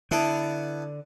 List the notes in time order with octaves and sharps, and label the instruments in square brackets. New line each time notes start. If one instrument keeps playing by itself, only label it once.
[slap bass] D3 [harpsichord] B3 E4 A5